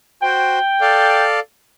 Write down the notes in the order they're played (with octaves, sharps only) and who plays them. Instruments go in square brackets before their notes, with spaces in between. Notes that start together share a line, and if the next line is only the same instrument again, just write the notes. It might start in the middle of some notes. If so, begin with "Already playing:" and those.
[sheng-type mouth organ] F#4 C5 [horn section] G5
[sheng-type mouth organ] A4 D5 F5